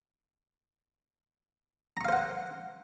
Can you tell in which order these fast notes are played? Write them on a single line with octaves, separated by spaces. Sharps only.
A#5 C#6 F5 C5 F#5